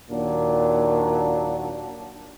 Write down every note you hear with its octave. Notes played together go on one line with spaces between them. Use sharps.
D#2 A#2 F#3 D4